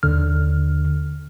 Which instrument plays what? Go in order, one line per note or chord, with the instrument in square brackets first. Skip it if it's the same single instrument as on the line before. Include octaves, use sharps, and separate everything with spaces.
[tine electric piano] D#2 D3 F6